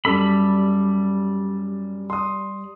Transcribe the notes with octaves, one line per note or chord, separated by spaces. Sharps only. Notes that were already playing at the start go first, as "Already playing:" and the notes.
F#2 G3 A4 B5 E6
C6 D#6